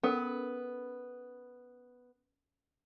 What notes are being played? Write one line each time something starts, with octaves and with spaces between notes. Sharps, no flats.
B3 C#4 A4 A#4